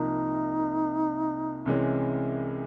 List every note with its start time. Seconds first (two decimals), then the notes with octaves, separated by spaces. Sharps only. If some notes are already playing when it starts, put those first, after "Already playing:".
Already playing: C2 C3 F3 A#3 D#4
1.66 C2 C3 E3 G#3 C#4